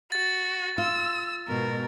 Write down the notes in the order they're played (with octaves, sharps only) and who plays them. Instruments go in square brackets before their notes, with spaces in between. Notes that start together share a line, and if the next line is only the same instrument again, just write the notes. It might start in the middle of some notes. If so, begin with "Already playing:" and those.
[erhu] F#4 [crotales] A6
[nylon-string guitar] F4 [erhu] E6
[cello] G#2 B2 [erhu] A#4